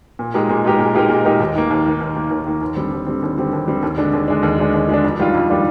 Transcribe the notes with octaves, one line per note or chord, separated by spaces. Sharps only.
A#2
G#3 D#4 G4 A#4
A#2
G#3 D#4 G4 A#4
A#2
G#3 D#4 G4 A#4
A#2
G#3 D#4 G4 A#4
D#2
D#3 A#3
D#2
D#3 A#3
D#2
D#3 A#3
D#2
D#3 A#3
D#2
D3 G3 C4
D#2
D3 G3 C4
D#2
D3 G3 C4
D#2
D3 G3 C4
D#2
D3 G#3 D4
D#2
D3 G#3 D4
D#2
D3 G#3 D4
D#2
D3 G#3 D4
F2
D#3 G3 D4 F4
F2
D#3 G3 D4 F4